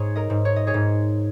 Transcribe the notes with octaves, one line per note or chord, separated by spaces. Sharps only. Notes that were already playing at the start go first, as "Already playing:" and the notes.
Already playing: G#2 G#4 C#5
A#4 D#5
G#2
C#5
D#5
G#4 C#5
G#2